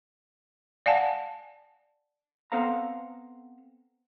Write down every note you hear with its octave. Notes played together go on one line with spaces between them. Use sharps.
D5 F5 F#5 G#5 A5
B3 C4 A4 C5 F5 A#5